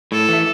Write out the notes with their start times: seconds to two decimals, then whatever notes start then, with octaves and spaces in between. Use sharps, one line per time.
0.12 A2 A4
0.29 E3 A3